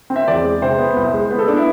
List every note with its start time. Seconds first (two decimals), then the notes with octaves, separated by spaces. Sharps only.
0.10 C4
0.16 E5
0.28 E2 D5
0.45 G#3
0.62 C3 C5
0.78 B3
0.96 C2
1.13 G#3
1.31 B3
1.39 A4
1.48 B3 D4
1.57 E4